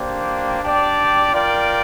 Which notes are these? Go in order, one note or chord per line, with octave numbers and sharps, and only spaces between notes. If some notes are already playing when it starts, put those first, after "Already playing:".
Already playing: A#3 D4 G4 C5
D4 G4 D5 G5
F4 A#4 D5 G5